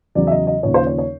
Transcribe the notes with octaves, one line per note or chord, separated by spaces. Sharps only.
E2 C#3 F#3 D5
E5
D#5
D#5
D#2 C#3 F3 C#5
C5
C#5
C#5